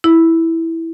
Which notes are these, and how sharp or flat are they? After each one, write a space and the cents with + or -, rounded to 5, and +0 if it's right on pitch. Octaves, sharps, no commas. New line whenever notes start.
E4 -5